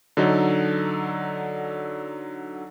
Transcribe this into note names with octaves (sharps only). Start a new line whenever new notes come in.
D3 F#3 D#4 A4